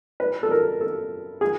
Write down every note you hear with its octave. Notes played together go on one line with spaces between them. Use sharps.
B4
A4
A#4
A4
G#4